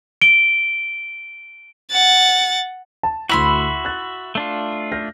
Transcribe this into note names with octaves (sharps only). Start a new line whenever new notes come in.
D7 G7
F#5 A6
A5
D2 E4 F#4 E5 B5 C6 F7
F#6 A6
A3 D4 F4
F6 G6 A#6